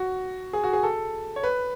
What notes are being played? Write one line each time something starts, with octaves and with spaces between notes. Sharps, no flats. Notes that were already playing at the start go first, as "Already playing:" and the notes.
Already playing: F#4
G#4
F#4
G#4
A4
C#5
B4